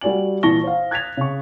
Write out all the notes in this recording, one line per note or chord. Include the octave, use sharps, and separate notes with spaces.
G3 F#4 D5 G#5 F#7
A#2 E3 A5 C#6 A#6 G7
C5 F5
F#6 G#6 A6 B6 F7
C#3 C#6